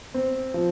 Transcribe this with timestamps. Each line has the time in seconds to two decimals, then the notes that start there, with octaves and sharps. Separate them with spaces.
0.14 C4
0.54 F3